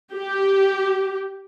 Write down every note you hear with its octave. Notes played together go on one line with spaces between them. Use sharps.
G4